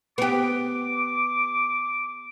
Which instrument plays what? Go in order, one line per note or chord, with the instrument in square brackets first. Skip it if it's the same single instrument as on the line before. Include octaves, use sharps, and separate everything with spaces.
[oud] B3 G4 [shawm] D6